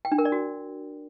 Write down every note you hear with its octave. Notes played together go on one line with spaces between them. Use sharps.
G5
D4
A#4
D5
F#4